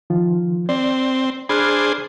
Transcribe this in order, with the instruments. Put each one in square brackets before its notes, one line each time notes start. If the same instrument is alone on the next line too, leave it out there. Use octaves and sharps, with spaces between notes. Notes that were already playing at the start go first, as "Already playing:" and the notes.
[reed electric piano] D#3 F3 F4
[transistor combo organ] C4 [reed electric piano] D5
[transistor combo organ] D4 G#4 C5 [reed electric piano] B5 F6 F#6